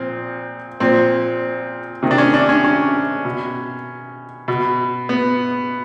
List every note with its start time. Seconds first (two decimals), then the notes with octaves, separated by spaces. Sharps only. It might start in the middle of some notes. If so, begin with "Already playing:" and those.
Already playing: A#2 F3 C4
0.80 A#2 F3 C4
2.03 C3 D#3
2.11 D4
2.18 C#4
2.34 D4
2.49 C#4
2.64 C#4
3.25 B2
4.48 B2
5.09 B3